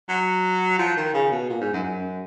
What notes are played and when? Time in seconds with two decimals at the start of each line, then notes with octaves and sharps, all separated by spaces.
0.09 F#3
0.79 F3
0.97 D#3
1.14 C#3
1.31 B2
1.49 A#2
1.61 G#2
1.73 F#2
1.83 F#2